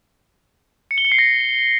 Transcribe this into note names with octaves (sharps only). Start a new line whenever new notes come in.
C#7
G7
C#7
C7
A#6